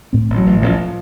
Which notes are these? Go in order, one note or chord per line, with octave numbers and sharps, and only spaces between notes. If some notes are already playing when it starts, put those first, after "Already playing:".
A2 C4
A1
F#3
A1
A1 F3